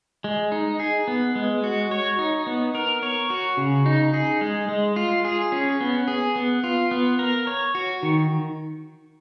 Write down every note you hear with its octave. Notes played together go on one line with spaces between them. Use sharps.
G#3
D#4
G#4
B3
G#3
F#4
C#5
D#4
B3
A#4
C#5
F#4
C#3
D#4
G#4
G#3
G#3
F4
G#4
C#4
B3
G#4
B3
F4
B3
A#4
C#5
F#4
D#3